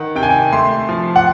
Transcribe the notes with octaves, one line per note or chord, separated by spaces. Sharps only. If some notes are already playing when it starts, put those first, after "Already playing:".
Already playing: D#3 F#5
C3 G5
G#5
G5
A3 C6
F3
F#5